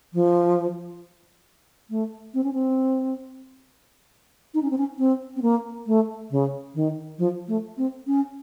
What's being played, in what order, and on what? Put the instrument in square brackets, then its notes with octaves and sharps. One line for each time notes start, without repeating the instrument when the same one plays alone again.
[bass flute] F3
A3
C4
C#4
C4
D#4
C#4
C4
C#4
C4
C4
A#3
A3
C#3
D#3
F3
A3
C4
C#4